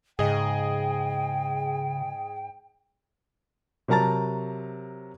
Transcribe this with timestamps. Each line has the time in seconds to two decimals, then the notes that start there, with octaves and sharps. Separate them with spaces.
0.19 G#2 C#3 G#4 D#5 G5
3.88 C3 F#3 A#4 A5 A#5 A6